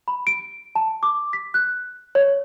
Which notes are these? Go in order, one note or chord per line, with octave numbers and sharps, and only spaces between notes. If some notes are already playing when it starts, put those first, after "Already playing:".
B5
D7
A5
D6
B6
F#6
C#5